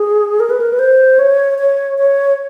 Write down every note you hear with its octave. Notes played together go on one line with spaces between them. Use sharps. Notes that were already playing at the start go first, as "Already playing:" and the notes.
Already playing: G#4
A#4
B4
A#4
B4
C5
C#5
C#5
C#5